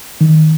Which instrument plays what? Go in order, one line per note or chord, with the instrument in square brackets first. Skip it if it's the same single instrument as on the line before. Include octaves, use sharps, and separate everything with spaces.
[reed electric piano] D#3